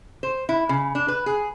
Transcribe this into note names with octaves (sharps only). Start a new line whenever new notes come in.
C5
E4
C#3
D4
B4
G#4